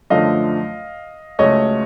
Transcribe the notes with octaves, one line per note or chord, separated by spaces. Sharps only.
F#2 D3 F3 A3 D#5 F5
C#2 C#3 F#3 A3 C#5 D#5